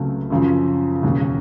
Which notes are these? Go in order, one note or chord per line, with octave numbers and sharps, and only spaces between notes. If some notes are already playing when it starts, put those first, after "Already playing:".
Already playing: C#2 C#3 F#3 A3 C4
F#2 C#3 F3
E1 D#2 C#3